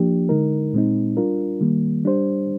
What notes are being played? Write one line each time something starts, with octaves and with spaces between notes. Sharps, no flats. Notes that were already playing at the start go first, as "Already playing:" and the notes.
Already playing: F3 A#3 D4 G4
D3 G#3 D#4 A#4
A#2 G#3 C4 D#4
G3 D4 F4 A#4
D#3 G3 A#3
G3 D4 G4 C5